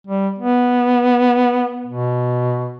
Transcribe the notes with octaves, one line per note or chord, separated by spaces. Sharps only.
G3
B3
B2